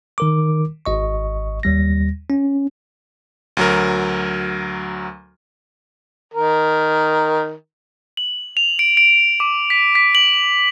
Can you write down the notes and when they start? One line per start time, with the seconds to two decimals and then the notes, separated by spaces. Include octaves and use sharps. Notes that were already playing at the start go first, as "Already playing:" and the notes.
0.18 D#3 A#4 D6
0.85 G#1 D#5 C#6
1.63 D#2 G3 A#6
2.30 C#4
3.57 D2 F#3 A#4
6.33 D#3 A#4
8.17 F#7
8.57 F7
8.79 D7
8.97 D7
9.40 D6
9.70 B6
9.95 B6
10.15 F#7